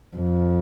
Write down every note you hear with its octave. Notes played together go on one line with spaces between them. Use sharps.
F2